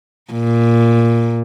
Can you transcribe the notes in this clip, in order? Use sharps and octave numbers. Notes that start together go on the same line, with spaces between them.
A#2